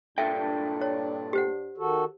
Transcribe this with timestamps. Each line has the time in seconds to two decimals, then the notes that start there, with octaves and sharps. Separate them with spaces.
0.18 G2 A#2 D4 A4 E5 G5
0.81 C#5
1.33 G4 C5 F#5
1.77 D#3 F#4 A4